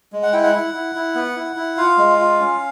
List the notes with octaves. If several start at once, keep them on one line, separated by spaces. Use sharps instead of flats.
G#3
F#5
E4 G5
F#5
E4
E4
E4
B3
E4
E4
F4 F5
G#3
F4
C#4